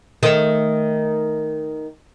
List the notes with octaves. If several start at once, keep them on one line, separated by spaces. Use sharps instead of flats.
D#3 A3